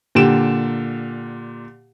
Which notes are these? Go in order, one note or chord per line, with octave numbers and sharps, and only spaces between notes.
A#2 D3 G4 D7 E7